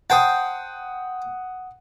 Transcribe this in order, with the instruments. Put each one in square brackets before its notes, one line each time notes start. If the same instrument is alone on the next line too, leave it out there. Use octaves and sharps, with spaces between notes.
[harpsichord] C5 G5 A5 [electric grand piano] F#5 D#6